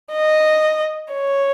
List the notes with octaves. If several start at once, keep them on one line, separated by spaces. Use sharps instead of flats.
D#5
C#5